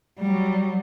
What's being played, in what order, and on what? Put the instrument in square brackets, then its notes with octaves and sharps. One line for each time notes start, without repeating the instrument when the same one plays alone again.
[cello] F#3 G3